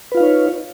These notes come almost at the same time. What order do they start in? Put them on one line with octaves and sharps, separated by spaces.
B4 F4 F5 D#4 C#5